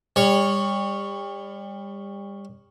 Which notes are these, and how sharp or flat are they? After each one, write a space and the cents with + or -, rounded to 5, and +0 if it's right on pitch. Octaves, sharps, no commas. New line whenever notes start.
G3 +30 C#5 +0